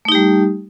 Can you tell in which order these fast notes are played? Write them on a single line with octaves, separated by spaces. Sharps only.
A3 D#4 G4 G3